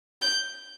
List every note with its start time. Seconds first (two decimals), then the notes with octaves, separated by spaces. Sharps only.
0.22 G6